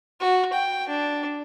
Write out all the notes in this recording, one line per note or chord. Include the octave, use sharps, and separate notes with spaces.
F#4
G5
D4